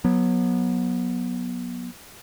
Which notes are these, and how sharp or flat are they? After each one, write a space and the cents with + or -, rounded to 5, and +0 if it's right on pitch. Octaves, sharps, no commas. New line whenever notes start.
F#3 -25 B3 -25